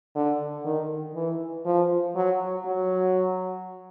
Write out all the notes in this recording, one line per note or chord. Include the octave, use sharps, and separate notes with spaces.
D3
D#3
E3
F3
F#3
F#3